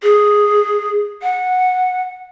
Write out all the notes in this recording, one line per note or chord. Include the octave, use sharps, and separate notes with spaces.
G#4
F#5